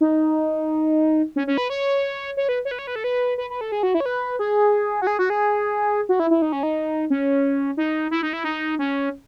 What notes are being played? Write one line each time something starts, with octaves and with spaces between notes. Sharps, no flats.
D#4
C#4
C#4
B4
C#5
C#5
B4
C#5
B4
C#5
B4
A4
B4
B4
B4
A4
G#4
F#4
E4
C#5
B4
G#4
F#4
G#4
F#4
G#4
F#4
E4
E4
D#4
C#4
D#4
C#4
D#4
E4
D#4
E4
D#4
C#4